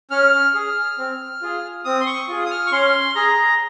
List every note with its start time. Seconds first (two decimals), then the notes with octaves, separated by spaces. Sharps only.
0.11 C#4 F6
0.54 G#4
0.98 C4
1.42 F4 G#4
1.85 C4 D#6
2.01 C6
2.06 C#6
2.28 F4 G#4
2.45 D#6
2.51 F6
2.67 C#6
2.72 C#4 C6
3.15 G#4 A#5